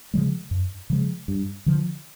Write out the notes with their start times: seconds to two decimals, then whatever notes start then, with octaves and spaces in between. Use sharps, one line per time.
0.14 C#3 F3 G#3
0.51 F#2
0.90 C#3 F3 G#3
1.28 G2
1.66 D3 F3